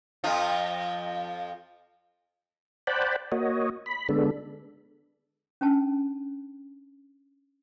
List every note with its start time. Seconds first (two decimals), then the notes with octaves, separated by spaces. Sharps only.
0.24 F2 F3 F4
2.87 C5 D5 F#5 G5 A5 B5
3.32 A#3 F#4 C#5 D#5
3.86 B5
4.09 D3 G#3 B3 D4 A4
5.61 C#4 D4 G5 A5